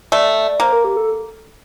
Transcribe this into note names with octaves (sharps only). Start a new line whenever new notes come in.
A3 D5
A#3 C5
A#4
G4
A4